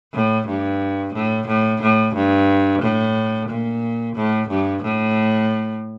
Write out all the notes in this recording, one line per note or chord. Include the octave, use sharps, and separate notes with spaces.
A2
G2
A2
A2
A2
G2
A2
A#2
A2
G2
A2